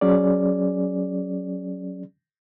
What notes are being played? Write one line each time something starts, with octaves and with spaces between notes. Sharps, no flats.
F#3 C#4 G#4 D5